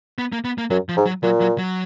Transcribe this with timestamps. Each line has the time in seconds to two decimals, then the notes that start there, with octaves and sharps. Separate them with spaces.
0.18 B3
0.32 A#3
0.44 B3
0.58 A#3
0.70 F#2 F#3
0.89 F3
0.97 G#2
1.06 F#3
1.23 A#2 F#3
1.41 F#3
1.58 F#3